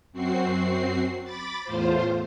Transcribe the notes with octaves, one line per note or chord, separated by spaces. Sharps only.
F#2 C4 F#4 C7
B5 D6 A6
E2 A2 F4 C5